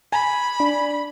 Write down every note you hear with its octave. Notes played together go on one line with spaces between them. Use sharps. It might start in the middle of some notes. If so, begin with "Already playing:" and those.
G#5 B5
D4